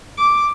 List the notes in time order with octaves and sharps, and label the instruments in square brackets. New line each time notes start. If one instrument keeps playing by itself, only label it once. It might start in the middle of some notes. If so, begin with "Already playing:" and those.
[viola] D6